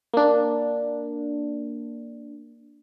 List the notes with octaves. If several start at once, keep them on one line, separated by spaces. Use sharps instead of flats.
A#3 D4